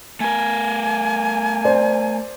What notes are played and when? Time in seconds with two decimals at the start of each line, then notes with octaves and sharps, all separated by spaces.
0.20 A3 A#4 G#5
1.64 C5 D5